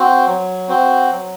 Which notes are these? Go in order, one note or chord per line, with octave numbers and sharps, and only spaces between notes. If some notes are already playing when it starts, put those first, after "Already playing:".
Already playing: C4 F#4 C5
F#3
C4 F#4 C5
F#3